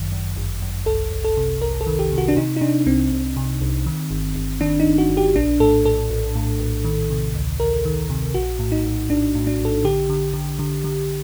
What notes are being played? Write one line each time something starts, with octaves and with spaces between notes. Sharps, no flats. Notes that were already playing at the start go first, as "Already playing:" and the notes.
Already playing: G1 F#2 D#3
F#2
G1
F#2
C2 A4
C2
A4
C3
C2 A#4
A4
D#3
G4
C3
F#4
D4
C3 D#4
D#4
C3 D4
C2 C4
C2
C3
C2
D#3
G1
G1
D#3 D4
D#4
G1
F#4
G1
G4
A#1 D4
A2 A4
A#1 A4
A#1
A2
A#1
D#3
C3
D2
D2 A#4
D#3
C3
A#1 F#4
A2
D#4
A#1
A#1 D4
A2
D4
A#1
A4
D3 G4
D3
D3
D3
D3